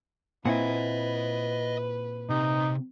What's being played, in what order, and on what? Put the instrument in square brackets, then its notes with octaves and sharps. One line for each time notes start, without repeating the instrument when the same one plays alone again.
[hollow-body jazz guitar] A#2 C4 E4 [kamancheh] B4 [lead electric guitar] D#5 F#5
[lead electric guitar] C3 [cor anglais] D#4